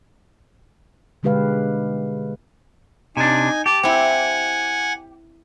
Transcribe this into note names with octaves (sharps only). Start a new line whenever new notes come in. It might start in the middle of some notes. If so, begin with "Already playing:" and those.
B2 D3 G#3 G4 B4 F5
C3 D4 D#4 G#5
G4 A5
C4 E4 F#5 G#5